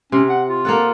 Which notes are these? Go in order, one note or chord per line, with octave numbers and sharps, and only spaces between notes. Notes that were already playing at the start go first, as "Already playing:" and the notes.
C3 C#4
F#5
F4
A#3 A4 F#5